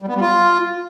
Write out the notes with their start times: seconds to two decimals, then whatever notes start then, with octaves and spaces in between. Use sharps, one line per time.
0.02 G3
0.08 B3
0.15 G3
0.21 F4